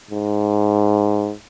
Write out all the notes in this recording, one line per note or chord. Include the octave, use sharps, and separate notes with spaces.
G#2